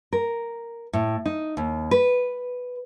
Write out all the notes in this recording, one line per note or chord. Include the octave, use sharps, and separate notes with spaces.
A#4
A2
D#4
D#2
B4